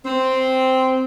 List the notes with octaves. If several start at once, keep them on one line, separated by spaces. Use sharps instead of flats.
C4